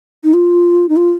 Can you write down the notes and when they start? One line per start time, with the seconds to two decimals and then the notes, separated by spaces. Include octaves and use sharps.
0.24 D#4
0.34 F4
0.89 D#4
0.96 F4